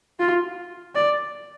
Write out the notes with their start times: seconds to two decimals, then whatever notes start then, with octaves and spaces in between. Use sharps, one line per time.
0.20 F4
0.95 D5